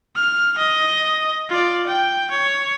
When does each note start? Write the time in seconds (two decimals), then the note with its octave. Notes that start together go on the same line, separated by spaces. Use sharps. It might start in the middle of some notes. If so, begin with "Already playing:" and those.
0.16 F6
0.58 D#5
1.49 F4 D5
1.87 G5
2.31 C#5